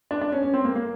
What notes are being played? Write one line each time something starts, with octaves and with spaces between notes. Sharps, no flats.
D4
D4
C#4
C#4
C4
A#3
A#3